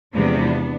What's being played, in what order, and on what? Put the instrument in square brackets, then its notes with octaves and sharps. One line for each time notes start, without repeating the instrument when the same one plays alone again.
[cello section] E2 C3 F3 G#3 B3 D4